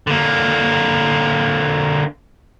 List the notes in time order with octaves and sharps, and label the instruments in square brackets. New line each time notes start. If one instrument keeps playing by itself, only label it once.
[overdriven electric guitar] D3 A#3